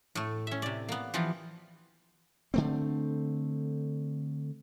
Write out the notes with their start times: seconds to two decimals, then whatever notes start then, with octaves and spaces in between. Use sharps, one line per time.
0.15 A2 A3
0.47 C#4 E5
0.62 C3 D5
0.89 A#3 B3
1.14 E3 F3 B3 F4 G4
2.54 D3 A3 C4